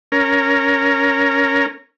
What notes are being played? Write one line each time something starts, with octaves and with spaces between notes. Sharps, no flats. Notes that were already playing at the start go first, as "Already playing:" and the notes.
C#4 A#4